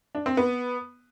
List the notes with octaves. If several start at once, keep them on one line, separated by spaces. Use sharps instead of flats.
D4
C4
B3